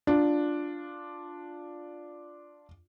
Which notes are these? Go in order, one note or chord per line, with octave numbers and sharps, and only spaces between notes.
D4 F4